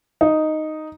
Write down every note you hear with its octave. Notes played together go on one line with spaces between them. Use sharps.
D#4